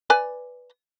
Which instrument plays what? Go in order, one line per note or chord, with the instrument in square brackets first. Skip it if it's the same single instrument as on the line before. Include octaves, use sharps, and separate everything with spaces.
[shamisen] B4 D5 G#5